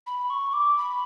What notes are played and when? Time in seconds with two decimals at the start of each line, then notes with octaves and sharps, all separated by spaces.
0.06 B5
0.30 C#6
0.53 D6
0.77 B5